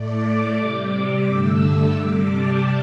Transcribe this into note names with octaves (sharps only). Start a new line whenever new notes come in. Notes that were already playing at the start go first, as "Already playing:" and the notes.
Already playing: A2 A3 D5
D6
C3 G3
G2 D3 A3 E6
E6
C3 G3 D6
A5